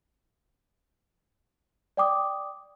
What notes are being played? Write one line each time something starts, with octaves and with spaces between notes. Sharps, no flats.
D5 G5 D6 D#6